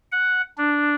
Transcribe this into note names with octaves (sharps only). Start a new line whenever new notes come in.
F#5
D4